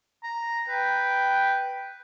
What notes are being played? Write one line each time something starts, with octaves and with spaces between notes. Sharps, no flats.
A#5
B4 G5